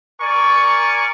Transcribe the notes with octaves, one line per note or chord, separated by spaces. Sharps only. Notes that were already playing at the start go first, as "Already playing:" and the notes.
A#4 D5 G#5 C#6